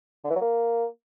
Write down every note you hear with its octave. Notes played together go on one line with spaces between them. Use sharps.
D3
E3
F#3
A#3